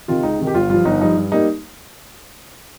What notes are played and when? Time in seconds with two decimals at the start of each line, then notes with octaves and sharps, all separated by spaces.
0.08 C3 D#3 F4
0.23 C#2 D#4
0.39 C3 D#3
0.47 G4
0.54 G1 F4
0.69 G2 F3 F4
0.85 G1 D#4
1.01 G2 F3 D#4
1.16 G2
1.32 G3 A#3 D#4